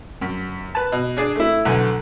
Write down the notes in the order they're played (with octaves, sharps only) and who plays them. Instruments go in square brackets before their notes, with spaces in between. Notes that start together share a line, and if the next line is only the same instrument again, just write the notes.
[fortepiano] F#2
B4 A5
B2
D4 G#4 D5
A3 E4
B1 D3 G#5